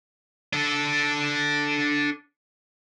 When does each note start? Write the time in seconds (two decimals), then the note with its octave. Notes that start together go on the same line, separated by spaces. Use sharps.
0.53 D4 A4